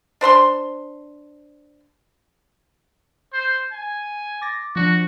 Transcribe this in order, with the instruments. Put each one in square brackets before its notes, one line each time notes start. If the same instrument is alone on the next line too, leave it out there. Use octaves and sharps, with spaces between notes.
[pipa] D4 C5 B5 C6
[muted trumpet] C5
G#5
[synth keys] D6 A6 A#6
[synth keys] F3 D4 A#6 [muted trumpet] F#4